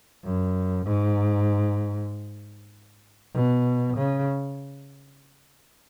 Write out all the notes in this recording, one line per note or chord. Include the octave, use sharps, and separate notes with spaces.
F#2
G#2
B2
C#3